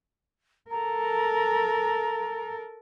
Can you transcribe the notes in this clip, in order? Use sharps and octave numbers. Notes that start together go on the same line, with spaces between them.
A4 A#4 A#5